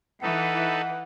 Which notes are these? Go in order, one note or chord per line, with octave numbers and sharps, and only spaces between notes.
E3 D#4 A4 B4 F#5